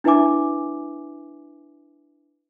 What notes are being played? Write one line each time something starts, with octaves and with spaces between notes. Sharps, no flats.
D4 E4 B4 E5 G#5 D6